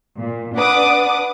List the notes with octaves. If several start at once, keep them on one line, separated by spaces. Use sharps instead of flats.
A#2
D4 B4 F#5 D6 D#6